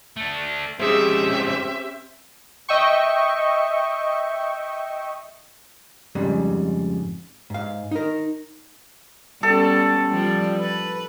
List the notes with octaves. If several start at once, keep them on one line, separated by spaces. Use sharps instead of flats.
A3 D4
F2 G#2 C4 C#4 G4 G#4 C5 E5
D#5 E5 G5 C#6
F2 G#2 C#3 G3
G#2 F5
D#4 A#4
G3 B3 C#4 A4
F3 G3 D5
B4